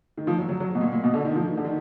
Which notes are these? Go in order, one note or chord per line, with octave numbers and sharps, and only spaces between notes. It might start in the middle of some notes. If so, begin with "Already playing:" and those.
D#3
F3
F#3
F#3
F#3
B2
A#2
A#2
B2
D3
D#3
F3
D#3
D3
D#3